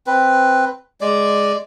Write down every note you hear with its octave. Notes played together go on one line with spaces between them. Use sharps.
C4 B4
G#3 D5